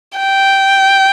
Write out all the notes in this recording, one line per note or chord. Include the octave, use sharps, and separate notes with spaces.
G5